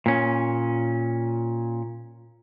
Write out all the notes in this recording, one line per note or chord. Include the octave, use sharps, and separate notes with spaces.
A#2 C#4